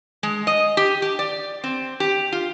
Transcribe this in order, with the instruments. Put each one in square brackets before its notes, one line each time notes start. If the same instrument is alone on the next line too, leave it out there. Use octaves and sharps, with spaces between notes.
[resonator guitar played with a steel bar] G#3
D#5
G4
G4
D5
C4
G4
F4